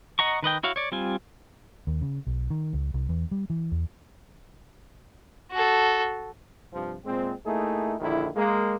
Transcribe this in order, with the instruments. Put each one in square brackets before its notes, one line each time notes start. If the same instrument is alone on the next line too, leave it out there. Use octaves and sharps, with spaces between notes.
[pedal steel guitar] D#5 F#5 A#5 C#6
D#3 B4 D#5 G5
E4 F#4 C#5 F5
C#5 D5
G3 C4 F4 G#5
[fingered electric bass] D#2
C#3
B1
D#3
C#2
C2
E2
G3
E3
E2
[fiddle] F#4 A4
[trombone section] G2 C3 F3
A#2 G#3 C4
A3 A#3 D#4 E4 G#4
A#1 D3 D#3 E4
G#3 A#3